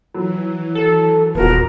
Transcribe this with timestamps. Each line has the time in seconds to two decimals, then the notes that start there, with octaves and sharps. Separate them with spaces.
0.14 E3 F#3
0.75 A4
1.35 D#1 B3 F#4 A#4